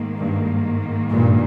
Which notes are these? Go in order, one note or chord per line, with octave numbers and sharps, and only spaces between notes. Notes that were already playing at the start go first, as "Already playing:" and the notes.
Already playing: G#2 D#3 A#3
G2
G2 A#2